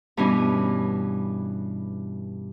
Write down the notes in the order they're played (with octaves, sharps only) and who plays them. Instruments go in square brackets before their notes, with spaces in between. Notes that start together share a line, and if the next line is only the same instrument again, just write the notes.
[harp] G2 B2 E3 C#4